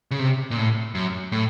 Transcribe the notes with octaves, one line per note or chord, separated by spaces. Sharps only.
C#3
C3
A#2
A2
F#2
A2